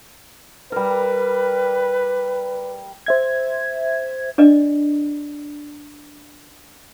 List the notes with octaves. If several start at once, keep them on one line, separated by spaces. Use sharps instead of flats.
G3 A#4 B4
C5 E5 G#6
D4 D5 D#5